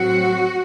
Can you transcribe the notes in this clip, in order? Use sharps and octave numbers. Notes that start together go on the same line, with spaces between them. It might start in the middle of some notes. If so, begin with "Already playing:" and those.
Already playing: A2 F#3 C4 F#4